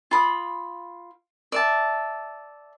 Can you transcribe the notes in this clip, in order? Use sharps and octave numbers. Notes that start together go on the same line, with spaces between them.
F4 B5 D#6
D5 E5 A5